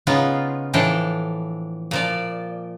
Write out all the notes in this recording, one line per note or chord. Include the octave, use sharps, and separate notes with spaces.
C#3 B3 D#4 F4
A2 E3 F3 D4 G5
A#2 F3 D5